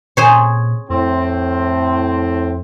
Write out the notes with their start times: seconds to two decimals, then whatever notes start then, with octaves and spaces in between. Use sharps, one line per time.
0.17 A#2 G#4 C5 C#5
0.90 F2 A2 C4